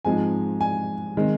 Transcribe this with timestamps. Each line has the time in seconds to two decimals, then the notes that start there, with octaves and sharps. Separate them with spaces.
0.05 G#2 F3 G#3 C4 G#5
0.61 G#5
1.17 D#3 G#3 C4